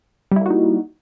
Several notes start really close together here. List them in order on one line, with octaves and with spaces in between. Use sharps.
G3 E4 A#3 F#4 D#4